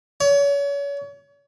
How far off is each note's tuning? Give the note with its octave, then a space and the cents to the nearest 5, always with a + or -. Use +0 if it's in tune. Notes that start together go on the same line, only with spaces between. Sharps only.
C#5 +35